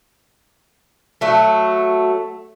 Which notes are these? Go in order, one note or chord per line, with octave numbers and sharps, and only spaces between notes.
F#3 A3